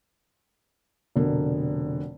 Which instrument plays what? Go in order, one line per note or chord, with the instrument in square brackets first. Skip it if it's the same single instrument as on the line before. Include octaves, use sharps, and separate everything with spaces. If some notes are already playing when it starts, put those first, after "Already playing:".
[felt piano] F1 B2 D3 A#4